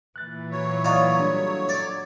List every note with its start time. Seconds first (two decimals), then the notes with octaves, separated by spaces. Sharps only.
0.16 A#2 E3 F#6 A6
0.52 F#3 C#5
0.84 D#4 F4 F#4 D5 A#5 C#6
1.19 G3 D4 A4
1.69 D5